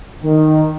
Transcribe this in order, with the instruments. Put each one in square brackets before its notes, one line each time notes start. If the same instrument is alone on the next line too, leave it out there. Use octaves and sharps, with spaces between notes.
[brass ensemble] D#3